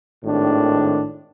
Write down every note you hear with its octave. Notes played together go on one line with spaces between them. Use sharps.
G#1 A2 D#3 D4